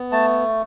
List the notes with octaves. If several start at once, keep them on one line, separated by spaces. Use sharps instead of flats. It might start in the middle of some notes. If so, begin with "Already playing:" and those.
Already playing: B3
A3 A5